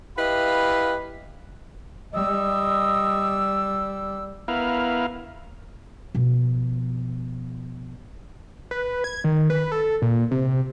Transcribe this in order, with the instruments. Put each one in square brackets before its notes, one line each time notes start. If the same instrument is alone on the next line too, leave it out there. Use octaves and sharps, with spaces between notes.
[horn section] E4 G4 B4 D#5 F5 B5
[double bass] G3 [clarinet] D#5 [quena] E6
[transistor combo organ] B3 E4 A#4 F5
[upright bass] B2 F3
[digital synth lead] B4
G#6
D#3
B4
A4
A#2
C3